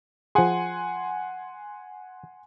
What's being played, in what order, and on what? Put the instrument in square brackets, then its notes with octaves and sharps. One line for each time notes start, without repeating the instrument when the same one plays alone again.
[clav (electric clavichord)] F3 G#4 [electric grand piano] F#5 G#5 C6